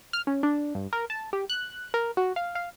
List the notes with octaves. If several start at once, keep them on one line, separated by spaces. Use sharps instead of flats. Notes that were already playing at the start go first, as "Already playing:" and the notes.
F6
C#4
D4
G2
A#4
A5
G4
F#6
A#4
F#4
F5
F5